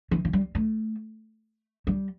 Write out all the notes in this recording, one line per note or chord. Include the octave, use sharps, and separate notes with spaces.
E3
E3
G3
A3
G3